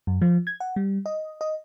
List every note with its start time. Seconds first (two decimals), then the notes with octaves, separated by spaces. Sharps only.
0.07 F#2
0.22 F3
0.47 G#6
0.60 F#5
0.76 G3
1.06 D#5
1.41 D#5